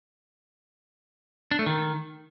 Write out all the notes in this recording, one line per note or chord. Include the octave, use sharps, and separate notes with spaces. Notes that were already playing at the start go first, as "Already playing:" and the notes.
D4
A3
D#3